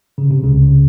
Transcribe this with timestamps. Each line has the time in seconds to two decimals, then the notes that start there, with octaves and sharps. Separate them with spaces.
0.18 C#3
0.31 C3
0.43 C#2 C#3